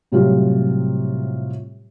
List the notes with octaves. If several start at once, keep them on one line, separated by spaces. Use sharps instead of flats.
A2 C3 F#3 G3 F4 G4